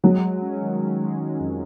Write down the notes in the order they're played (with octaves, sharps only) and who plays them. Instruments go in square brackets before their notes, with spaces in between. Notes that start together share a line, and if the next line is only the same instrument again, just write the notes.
[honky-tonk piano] F#3 [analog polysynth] G#3
[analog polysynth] G#3
C#4
D#3
C#4
G#3
G#3
F2